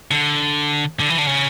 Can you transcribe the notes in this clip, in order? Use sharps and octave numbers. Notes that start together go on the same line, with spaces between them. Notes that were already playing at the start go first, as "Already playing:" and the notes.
D3
D3
E3
D3
C#3